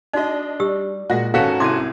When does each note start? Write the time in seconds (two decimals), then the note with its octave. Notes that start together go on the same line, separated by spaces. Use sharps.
0.13 D4 D#4 F#4 D#5
0.60 G3 G4 E6
1.10 A#2 G#3 F#4 A#6
1.34 D#2 G#2 B3 C#4 F#4 A4 F5
1.60 C2 E4 C6 D6 G#6 D#7